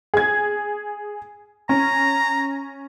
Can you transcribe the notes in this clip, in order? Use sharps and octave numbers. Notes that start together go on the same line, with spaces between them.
G#4 G#6
C#4 A#5